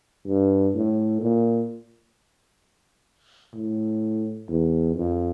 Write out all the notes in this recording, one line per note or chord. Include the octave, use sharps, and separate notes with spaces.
G2
A2
A#2
A2
E2
F2